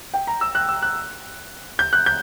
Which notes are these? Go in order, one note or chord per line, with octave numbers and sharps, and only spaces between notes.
G5
A#5
E6
F#6
E6
F#6
G6
F#6
G6